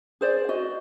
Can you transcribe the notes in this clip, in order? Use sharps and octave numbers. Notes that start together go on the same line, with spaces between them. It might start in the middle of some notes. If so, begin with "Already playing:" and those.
G#4 C5 D5
F#4 D#5